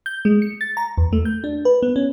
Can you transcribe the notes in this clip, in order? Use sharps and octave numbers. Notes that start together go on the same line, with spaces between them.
G6
G#3
C#7
A6
A#5
E2
A3
G6
D4
B4
B3
C#4